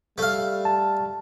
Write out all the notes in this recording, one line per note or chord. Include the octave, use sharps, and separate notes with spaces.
G3 A3 F5
A5